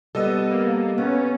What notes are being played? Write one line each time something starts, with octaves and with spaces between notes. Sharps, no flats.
G3 B3 A4 D#5 E6
A#3
B3 C#4